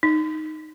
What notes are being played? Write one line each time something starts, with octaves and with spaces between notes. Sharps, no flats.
D#4